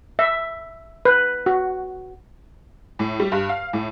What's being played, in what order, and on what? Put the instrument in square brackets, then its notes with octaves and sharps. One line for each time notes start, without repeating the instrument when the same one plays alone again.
[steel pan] E5
B4
F#4
[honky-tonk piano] A2
G3
G2
F5
A2